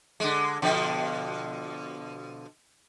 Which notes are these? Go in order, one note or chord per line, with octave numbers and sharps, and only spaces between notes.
D3 G#3
B2 D3 F3